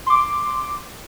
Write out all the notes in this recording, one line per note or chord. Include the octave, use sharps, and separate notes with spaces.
C6 D6